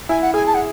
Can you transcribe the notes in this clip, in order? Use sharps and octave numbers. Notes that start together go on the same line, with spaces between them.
E4 G#5
F#5
G#4 G#5
A5
F#5